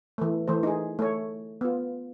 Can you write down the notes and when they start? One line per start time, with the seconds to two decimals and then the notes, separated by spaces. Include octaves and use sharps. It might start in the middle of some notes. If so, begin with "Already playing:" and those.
0.18 E3 A3
0.48 E3 A3 C5
0.63 D#4 G#4
0.99 A3 C#5
1.61 B3 F4